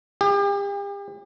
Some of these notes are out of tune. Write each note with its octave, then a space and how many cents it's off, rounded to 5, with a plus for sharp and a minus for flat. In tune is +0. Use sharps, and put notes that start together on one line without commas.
G4 +40